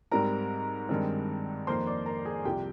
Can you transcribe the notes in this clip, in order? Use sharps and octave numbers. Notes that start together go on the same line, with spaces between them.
G#2 G3 C4 A#4 A#5
G2 D#3 G#3 C4
F2 D#3 A#3 C5 C6
D5 D6
A#4 A#5
G#4 G#5
C2 C3 F3 G4 G5